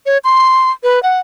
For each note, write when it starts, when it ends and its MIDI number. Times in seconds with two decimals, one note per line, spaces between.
0.06 0.18 73
0.24 0.71 84
0.83 1.02 71
1.03 1.19 78